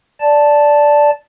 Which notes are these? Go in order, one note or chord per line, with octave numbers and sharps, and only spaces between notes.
D5 A5